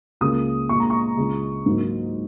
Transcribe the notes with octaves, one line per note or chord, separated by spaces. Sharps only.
C#2 C#3 A#3 D#6
A#2 G#3 C#6
A#5
C#6
C#2 C#3 G#3
G#2 F#3 A#3